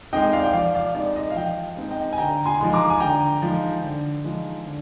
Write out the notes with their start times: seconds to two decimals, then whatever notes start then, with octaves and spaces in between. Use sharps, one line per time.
0.13 G#3 C4 D#4 D#5 G5
0.33 D5 F5
0.44 G5
0.53 F3 D5 F5
0.75 D5 F5
0.95 G#3 C4 D#4 D5
1.16 D#5
1.31 F5
1.36 F3 D#5 G5
1.77 G#3 C4 D#4
1.91 D#5 G5
2.13 G#5
2.18 D3 G5 A#5
2.45 G#5 C6
2.60 F3 G#3 D#4 C6
2.73 A#5 D6
2.90 G#5
3.00 D3 G5 A#5
3.42 F3 G#3 D#4
3.83 D3
4.24 F3 G#3 D#4
4.66 D3